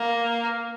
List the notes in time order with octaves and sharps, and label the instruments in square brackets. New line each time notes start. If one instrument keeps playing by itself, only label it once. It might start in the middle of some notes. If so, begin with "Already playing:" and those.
Already playing: [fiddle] A#3